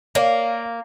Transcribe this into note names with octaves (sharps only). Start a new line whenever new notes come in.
A#3 C#5 D5 F5